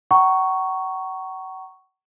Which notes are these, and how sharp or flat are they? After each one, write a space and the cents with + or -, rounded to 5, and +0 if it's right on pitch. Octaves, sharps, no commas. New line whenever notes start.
F#5 +40 A#5 +0 C#6 +0